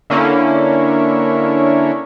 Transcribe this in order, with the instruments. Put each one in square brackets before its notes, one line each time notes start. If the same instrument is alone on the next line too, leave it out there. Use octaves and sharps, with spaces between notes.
[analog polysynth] D3 A#3 C#4 E4